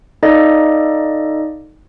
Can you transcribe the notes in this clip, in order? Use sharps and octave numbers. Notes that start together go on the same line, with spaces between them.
D#4 A4 D5 D#5 F5